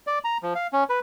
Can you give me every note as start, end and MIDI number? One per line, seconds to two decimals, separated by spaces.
0.07 0.19 74
0.24 0.38 82
0.43 0.54 53
0.55 0.67 77
0.73 0.84 61
0.89 1.00 71